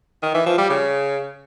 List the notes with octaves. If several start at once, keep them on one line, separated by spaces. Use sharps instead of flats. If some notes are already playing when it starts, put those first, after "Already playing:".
D#3
E3
F3
G3
C#3